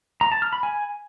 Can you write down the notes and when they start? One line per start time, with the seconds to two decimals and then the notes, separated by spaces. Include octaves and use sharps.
0.21 A#5
0.32 A5
0.42 F6
0.53 B5
0.63 G#5